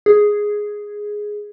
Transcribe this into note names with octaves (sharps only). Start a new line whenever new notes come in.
G#4